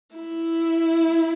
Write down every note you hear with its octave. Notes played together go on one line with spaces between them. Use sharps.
E4